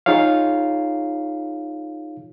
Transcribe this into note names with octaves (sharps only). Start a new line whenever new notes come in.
D#4 F4 G#4 C#5 F5